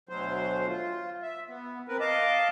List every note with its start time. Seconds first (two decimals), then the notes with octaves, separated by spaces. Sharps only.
0.09 D2 B2 F#3 C5
0.68 F4
1.22 E5
1.48 B3
1.88 C4 A#4 B4
2.00 D#5 F5 A5 D6